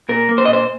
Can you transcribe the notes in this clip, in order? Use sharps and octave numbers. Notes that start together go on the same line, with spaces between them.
A#2 A#4
A#3
C5
A#2 D#5
C5